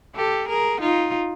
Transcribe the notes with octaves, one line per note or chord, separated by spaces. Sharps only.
G4 A4
G#4 A#4
D#4 F4